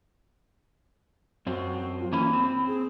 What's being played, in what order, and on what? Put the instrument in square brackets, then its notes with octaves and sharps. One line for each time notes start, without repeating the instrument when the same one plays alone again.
[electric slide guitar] F#2 C4 [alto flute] F#4
[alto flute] F4
[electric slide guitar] E3 A#3 C#4 [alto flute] B5
[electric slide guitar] C4
[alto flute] G#4